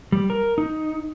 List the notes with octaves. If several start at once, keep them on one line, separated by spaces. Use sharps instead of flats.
G3
A#4
D#4